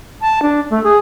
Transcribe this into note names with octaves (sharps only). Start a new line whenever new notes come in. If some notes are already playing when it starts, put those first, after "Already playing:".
A5
D4
A3
G#4